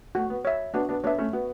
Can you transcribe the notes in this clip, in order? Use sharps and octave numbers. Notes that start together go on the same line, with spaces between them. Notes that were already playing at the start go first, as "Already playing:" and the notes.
A3 F#4
B3
C#5 E5
B3 D4 F#4
B3 D4
B3 D4 C#5 E5
A3 C#4
B3 F#4